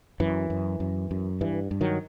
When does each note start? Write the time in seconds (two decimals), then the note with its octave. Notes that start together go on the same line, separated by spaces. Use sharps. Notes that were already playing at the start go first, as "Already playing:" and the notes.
0.20 F#2 E3
0.50 F#2
0.80 F#2
1.11 F#2
1.41 G2 E3
1.71 G2
1.81 D#3 F#3